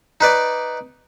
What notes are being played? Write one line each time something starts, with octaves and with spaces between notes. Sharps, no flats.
D#4 B4 D5